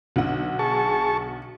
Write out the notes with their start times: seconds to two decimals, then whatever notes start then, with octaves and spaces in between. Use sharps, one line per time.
0.16 B1 D3 F#5
0.59 G#4 A5 C#6